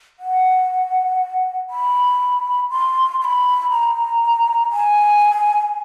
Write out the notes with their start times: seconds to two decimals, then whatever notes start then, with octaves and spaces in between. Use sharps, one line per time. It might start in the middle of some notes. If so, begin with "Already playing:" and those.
0.19 F#5
1.70 B5
2.71 C6
3.21 C6
3.24 B5
3.71 A#5
4.72 G#5